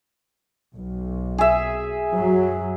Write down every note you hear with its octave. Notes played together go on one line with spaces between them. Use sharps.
B1
G#4 E5
F#2 F#3